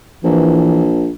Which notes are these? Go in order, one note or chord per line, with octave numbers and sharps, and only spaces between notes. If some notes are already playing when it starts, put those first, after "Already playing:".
A#1 E3